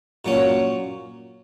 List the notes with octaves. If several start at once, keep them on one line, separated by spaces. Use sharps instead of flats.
A#2 F#3 C#4